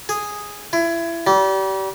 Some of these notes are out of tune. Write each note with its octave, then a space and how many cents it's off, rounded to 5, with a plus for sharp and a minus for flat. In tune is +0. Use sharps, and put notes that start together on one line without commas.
G#4 -5
E4 +25
G3 -30